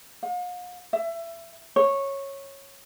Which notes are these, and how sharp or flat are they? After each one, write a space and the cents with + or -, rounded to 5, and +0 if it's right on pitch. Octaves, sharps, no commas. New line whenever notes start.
F5 +45
E5 +25
C#5 -10